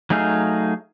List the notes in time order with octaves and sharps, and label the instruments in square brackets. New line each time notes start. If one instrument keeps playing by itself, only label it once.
[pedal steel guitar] F#3 A3 D#4 G#4 F5